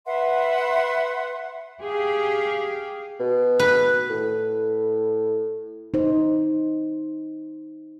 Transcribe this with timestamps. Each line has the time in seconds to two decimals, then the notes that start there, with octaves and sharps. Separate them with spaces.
0.06 B4 E5 F#5 C6
1.81 G4 G#4 F5
3.20 B2
3.59 B4
4.10 A2
5.94 D#4 C5